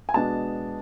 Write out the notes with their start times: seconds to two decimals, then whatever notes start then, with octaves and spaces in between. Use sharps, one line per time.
0.09 G#5
0.14 B2 G#3 B3 D4 A5